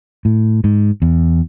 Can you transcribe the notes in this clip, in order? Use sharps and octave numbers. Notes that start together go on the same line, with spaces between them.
A2
G#2
E2